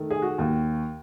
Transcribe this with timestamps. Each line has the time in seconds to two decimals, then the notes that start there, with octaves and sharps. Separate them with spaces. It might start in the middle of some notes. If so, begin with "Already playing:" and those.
Already playing: D#3 A3
0.11 G#4
0.22 F#4
0.38 D#2